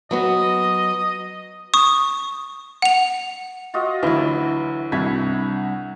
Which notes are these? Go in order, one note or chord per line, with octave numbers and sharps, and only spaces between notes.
F#3 B3 F#4 D#5
C#6 D#6
F#5 F7
F4 F#4 D#5
D2 E3 F#3 E4 E5
C2 G3 C4 D4 F#4 B5 G#6 B6